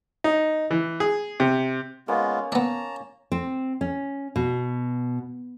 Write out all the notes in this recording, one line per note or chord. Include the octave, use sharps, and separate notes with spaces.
D#4
E3
G#4
C3
G#3 A#3 B3 C#4 F4
B3 D4 A5 A#5
C4
C#4
B2